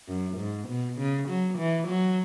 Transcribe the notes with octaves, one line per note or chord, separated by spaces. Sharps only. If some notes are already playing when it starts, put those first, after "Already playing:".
F#2
G#2
B2
C#3
F#3
E3
F#3